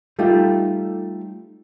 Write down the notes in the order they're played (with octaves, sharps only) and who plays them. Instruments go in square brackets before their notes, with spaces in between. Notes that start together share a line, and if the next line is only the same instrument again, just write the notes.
[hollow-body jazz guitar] G3 A3 D#4 F4 G4